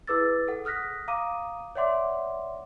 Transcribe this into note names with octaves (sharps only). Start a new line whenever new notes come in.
E4 G#4 B4 D6 E6 A6
G#4 A4 F#5
D#6 F6 F#6 A#6 B6
F5 A#5 D6 D#6 D#7
C#5 D5 E5 F#5 C6 D6